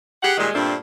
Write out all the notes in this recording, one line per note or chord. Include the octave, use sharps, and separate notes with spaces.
G4 G#4 F#5
A#2 D#3 G3 G#3
G2 A#2 A3 C4 D4